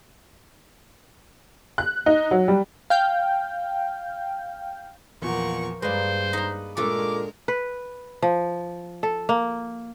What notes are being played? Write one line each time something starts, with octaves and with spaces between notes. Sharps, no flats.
F#6
D#4
F#3
G3
F5 G5
E2 A#2 F3 A#4 F#5 C#6
G2 G#3 A#3 B4 C5 D5
D#4 A#5
A#2 G#3 A3 D4 A4 A#4 D6
B4
F3
A4
A#3